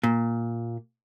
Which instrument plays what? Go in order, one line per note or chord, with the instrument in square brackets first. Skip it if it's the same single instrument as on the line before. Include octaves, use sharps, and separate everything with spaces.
[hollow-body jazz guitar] A#2